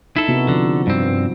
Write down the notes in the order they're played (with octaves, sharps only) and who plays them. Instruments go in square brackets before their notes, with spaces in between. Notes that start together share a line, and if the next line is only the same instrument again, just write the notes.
[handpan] D#4 [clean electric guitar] E4 A4
[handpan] C3 B3 F#4
[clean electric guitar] D3 [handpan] F3
[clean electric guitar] G2 C4